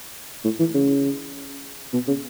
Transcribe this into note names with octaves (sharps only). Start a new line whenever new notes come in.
A2
E3
C#3
B2
C#3